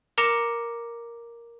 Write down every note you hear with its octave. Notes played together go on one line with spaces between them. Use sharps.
A#4 A#5 D6 A#6 C#7 E7